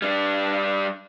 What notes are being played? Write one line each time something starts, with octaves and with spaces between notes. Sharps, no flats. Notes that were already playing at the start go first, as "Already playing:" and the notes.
G3 D4